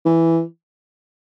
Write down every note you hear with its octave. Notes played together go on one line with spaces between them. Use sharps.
E3